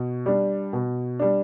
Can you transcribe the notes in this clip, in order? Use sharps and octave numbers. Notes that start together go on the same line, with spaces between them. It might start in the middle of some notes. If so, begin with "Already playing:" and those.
Already playing: B2
G3 D4
B2
G3 D4